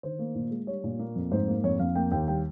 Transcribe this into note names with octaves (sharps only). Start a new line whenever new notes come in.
D#3 C5
A#3
A#2
G#3
G3 C#5
A#2
A#3
F2
G#2 C5
A#3
F2 C#5
F2 F5
A#3 G5
D#2 G5
G3 G5